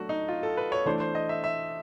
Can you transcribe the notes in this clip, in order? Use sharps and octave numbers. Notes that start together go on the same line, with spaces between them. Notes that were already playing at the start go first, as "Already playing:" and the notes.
Already playing: F#3 A3 D4 F#4
D#4
F4
A4
B4
C#5
E3 A3 D4 C5
C5
D#5
E5
E5